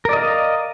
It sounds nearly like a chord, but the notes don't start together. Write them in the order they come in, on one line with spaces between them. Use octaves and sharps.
A#4 D5 D#5 F5